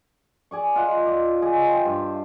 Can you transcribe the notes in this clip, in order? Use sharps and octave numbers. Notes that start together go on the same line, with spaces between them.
G#4 D5 C#6
F4 D#5 F#5
F4 D5 D#5
G#4 D#5
C5 G5
G2 E5